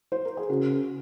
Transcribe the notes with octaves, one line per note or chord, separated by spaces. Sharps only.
C5
A#4
G#4
C#3 F#4